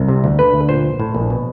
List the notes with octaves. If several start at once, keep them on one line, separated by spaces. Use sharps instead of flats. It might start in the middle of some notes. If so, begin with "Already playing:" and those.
Already playing: C2
C3
D2
D3 B4
D2
A#2 C5
A#1
A2
A#1
B2